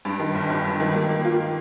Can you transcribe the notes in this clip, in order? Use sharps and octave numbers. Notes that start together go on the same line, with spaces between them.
G2
D#3
G1
G1
G2
D#3
A#3
A#3
F4